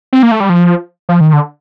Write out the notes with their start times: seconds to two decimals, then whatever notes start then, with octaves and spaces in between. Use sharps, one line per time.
0.13 C4
0.23 A#3
0.31 A3
0.40 G3
0.50 F3
1.09 F3
1.21 D#3
1.33 D3